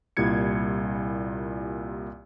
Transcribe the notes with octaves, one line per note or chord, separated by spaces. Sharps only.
C2 A#2 G3 E4 G#6 C#7